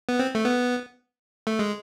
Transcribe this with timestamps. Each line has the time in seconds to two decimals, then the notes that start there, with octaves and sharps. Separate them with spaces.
0.09 B3
0.20 C4
0.35 A3
0.44 B3
1.47 A3
1.59 G#3